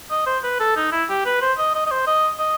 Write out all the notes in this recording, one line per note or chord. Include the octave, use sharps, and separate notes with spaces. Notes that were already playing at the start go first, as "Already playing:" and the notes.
D#5
C5
B4
A4
D#4
E4
G4
B4
C5
D#5
D#5
D#5
C5
D#5
D#5